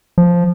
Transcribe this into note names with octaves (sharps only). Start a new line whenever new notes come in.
F3